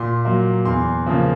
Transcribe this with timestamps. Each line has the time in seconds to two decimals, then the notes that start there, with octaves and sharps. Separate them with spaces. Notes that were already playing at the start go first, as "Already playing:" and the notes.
Already playing: A#2 C6
0.25 F#3 A#3
0.65 E2 C6
1.06 C#3 F3 A#3